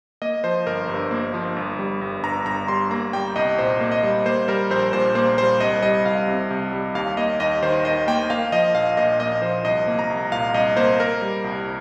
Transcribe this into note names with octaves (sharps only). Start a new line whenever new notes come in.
A#3 D#5
F3 C5
G1 A#4
G2
A#3
F3
G1
G3
G1
G2 A#5
G1 A#5
G3 C6
A#3 A#5
G3 G5
C2 D#5
A#2 C5
A#3
D#5
G3
A#3 C5
G3 A#4
A#1 C5
A#2 C5
A#3 C5
G3 C5
C2 D#5
G3 D#5
C2 F5
C3
C2
G3
D#2 F5
A#3 D#5
D#2 D#5
D#3 C5
D#2 D#5
A#3 G5
A#3 F5
F3 D#5
A#1 F5
A#2 D#5
A#3 D#5
F3 C5
C2 D#5
A#3
A#5
C2
A#2 F5
C2 D#5
A#3 C5
A#3 A#4
G3
C2